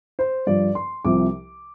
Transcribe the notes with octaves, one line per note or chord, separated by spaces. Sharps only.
C5
G2 F3 D5
C6
C2 C3 F3 D6